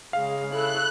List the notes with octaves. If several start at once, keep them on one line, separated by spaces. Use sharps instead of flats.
C#3 G#3 F5
E4 A4 C#5 F#6